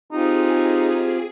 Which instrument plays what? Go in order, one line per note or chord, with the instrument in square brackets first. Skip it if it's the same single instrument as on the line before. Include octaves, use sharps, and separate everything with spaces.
[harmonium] C4 F4 G4 [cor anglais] D#4 [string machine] G#4